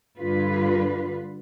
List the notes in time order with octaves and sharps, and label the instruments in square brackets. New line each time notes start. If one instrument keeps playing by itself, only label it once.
[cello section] G2 D3 F4 B4